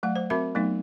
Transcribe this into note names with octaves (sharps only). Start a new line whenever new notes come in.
F#3 A3 F#5
C5
C4 F#4 A#4 E5 B5
F#3 A3 B3 D#4